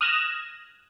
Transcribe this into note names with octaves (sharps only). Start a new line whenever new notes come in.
D#6 F6 F#6 G#6 A#6 E7